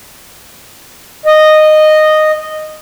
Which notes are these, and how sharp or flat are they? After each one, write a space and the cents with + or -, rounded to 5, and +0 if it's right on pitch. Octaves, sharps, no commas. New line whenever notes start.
D#5 -10